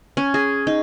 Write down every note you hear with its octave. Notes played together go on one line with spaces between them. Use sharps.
C#4
G#4
D#4